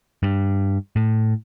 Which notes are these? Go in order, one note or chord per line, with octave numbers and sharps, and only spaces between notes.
G2
A2